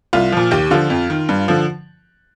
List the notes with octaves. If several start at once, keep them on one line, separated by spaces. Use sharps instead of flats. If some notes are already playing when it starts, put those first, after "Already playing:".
C2 F4
A#2 F3
D#2 G4
D3 F3 F4
F2
D#3
G2
D3 F3